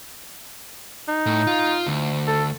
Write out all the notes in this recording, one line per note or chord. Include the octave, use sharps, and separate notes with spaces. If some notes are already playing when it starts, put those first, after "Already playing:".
D#4
A2
F4
D2
A4